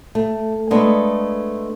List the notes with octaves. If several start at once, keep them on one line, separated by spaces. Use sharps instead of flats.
A3
G#3 A3 B3 D4